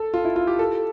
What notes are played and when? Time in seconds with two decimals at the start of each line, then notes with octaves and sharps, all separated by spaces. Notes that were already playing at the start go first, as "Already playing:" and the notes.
Already playing: A4
0.14 F4
0.25 E4
0.36 F4
0.47 G4
0.59 A4